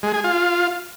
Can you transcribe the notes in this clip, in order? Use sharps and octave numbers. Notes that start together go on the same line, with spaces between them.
G#3
G#4
F4